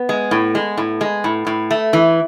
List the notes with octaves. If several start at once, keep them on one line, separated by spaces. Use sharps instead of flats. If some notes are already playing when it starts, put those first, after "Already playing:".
Already playing: B3
G#3
A2
G#3
A2
G#3
A2
A2
A3
E3